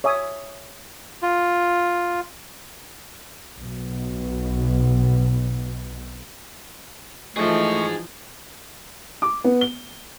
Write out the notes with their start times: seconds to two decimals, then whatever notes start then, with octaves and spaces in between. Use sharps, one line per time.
0.04 C#5 E5 G#5 D#6
1.23 F4
3.56 B1 B2
7.37 E3 F3 A3 D#4 G#4 D#5 C#6
9.22 D6
9.44 B3
9.61 G7